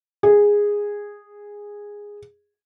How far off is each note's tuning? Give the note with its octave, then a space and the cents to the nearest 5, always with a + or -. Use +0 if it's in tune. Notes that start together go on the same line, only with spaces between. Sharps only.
G#4 -10